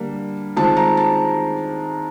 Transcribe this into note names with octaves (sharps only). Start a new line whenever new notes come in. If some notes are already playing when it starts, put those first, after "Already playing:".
Already playing: D3 G3 A#3 D4
D#3 G#3 C4 F4 A5
A#5
A5